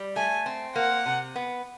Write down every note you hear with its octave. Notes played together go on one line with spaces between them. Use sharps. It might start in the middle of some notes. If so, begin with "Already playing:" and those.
Already playing: G3
A3 G#5
C4
A#3 F#5
C3
B3